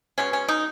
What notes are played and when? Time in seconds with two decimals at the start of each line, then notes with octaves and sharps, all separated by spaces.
0.18 B2 G#3 B3 C#4
0.33 C#4
0.48 D#4